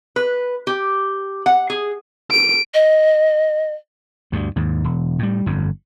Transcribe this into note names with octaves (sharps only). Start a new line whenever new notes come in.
B4
G4
F#5
G#4
D7
D#5
D2 G2
D#2 G#2
E1
A2 G3
G1 F2